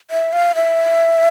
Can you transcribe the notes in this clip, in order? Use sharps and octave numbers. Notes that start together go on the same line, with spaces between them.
E5
F5
E5